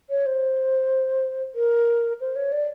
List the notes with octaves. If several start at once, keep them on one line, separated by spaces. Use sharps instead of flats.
C#5
C5
A#4
C5
C#5
D5